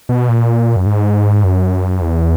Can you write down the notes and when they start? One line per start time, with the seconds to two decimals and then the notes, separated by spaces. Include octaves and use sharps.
0.09 B2
0.29 A#2
0.76 F#2
0.86 G#2
1.44 F#2
2.01 E2